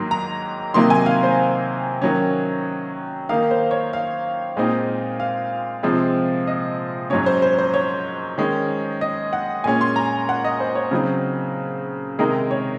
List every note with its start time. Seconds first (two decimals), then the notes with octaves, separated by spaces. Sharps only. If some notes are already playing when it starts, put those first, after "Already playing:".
Already playing: G#2 D#3 F#3 A#3 C6
0.11 A#5
0.74 C3 D#3 F#3 A#3 D#4 C6
0.90 G#5
1.06 F5
1.23 C5
2.02 D#3 F#3 C#4
3.29 D#3 A#3 D#4 F5
3.51 C5
3.71 C#5
3.93 F5
4.57 A#2 G#3 C4 D#4
5.20 F5
5.83 C3 F3 G#3 C4
6.47 D#5
7.10 G#2 F#3 C#4 C#5
7.26 C5
7.42 C5
7.58 C5
7.74 C#5
8.38 D#3 G#3 C#4
9.01 D#5
9.33 F#5
9.64 A#2 G#3 C#4 G#5
9.81 C6
9.96 A#5
10.29 F#5
10.44 D#5
10.60 C5
10.75 C#5
10.91 C#3 F#3 C4 D#4
12.19 C3 D#3 G#3 D#4 A#4
12.51 C#5